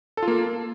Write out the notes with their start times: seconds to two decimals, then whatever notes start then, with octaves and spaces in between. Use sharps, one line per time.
0.17 A4
0.22 F4
0.28 A#3